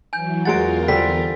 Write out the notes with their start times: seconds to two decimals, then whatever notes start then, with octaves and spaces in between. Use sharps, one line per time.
0.13 E3 F#3 G#5 G6
0.45 E2 F#3 G#3 F4 A#4 F#5 A6 D7
0.88 D3 G3 C4 B6